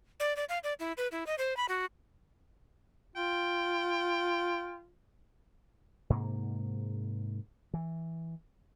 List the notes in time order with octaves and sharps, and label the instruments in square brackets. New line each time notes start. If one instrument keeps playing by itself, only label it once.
[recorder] D5
D5
F5
D5
E4
B4
E4
D#5
C5
B5
F#4
[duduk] F4 [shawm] G5
[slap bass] G#2 C3 A#3
E3